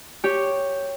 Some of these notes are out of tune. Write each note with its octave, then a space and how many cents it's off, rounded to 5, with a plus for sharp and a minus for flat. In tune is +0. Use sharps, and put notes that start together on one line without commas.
G4 +0 C#5 +0